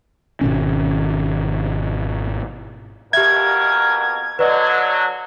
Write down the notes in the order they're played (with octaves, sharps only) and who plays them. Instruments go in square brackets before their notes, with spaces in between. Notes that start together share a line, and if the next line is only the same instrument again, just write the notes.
[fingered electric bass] G#1 B2 D#3 C#4
[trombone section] F2 B2 A#4 [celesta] G4 E5 [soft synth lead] G#6
[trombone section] D3 F#3 [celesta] B4 D5 D#5